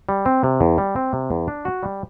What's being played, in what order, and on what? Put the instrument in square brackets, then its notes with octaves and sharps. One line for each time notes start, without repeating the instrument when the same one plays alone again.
[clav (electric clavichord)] G3
C4
C3
E2
G3
C4
C3
E2
D4
F#4
G3